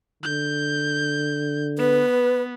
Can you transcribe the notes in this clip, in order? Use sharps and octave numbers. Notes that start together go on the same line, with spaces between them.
D3 G6
B3 B4